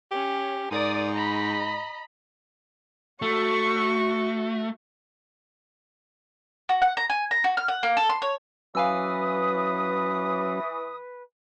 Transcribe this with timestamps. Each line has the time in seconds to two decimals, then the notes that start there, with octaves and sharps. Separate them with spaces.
0.11 C#4 G4
0.71 G#2 A#4 D5 D#6
1.12 D#5 A#5 B5
3.22 A3 F#4 C#6
6.69 F#4
6.82 F#5
6.97 A#5
7.10 G#5
7.31 A#5
7.44 F#4
7.57 F6
7.68 F#5
7.83 A#3
7.97 A4
8.09 C6
8.22 C#5
8.75 E3 F#3 C#4 B4 F5 G#5 D#6 E6